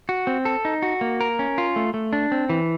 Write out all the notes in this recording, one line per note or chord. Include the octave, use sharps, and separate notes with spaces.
F#4
C4
A4
D#4
F#4
A#3
A#4
C#4
F4
A3
A3
D4
C4
E3